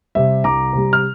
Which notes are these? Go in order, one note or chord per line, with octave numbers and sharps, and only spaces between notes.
C3 G3 E5
C2 A#5 D6
C3 G3
F6